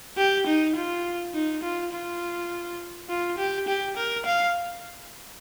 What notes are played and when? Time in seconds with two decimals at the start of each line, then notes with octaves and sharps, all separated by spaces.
0.17 G4
0.47 D#4
0.76 F4
1.34 D#4
1.63 F4
1.92 F4
3.09 F4
3.38 G4
3.68 G4
3.97 A#4
4.26 F5